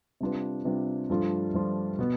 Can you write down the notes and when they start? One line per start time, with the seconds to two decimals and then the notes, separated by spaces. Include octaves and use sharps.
0.20 C3 G3 D4 F4 B4
0.65 C3 G3 D4 F4 B4
1.10 G2 F3 A3 D4 F4
1.54 G2 F3 A3 D4 F4
1.99 B2 B3